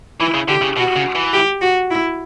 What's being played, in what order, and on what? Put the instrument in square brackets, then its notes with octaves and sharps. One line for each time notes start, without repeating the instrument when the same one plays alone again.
[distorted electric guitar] E3 [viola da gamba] E4
[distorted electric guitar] C#3
[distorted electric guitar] D3 [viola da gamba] G4
[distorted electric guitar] C#3
[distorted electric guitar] B2 [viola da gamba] F#4
[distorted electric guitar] C#3
E3
[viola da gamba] G4
F#4
E4